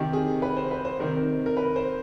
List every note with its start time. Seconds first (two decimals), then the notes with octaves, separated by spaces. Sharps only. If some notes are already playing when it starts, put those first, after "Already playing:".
Already playing: C3 D#3 G4
0.13 G#4
0.42 B4
0.57 C5
0.71 B4
0.85 C5
0.99 C3 D#3 A#4
1.46 A#4
1.57 B4
1.76 C5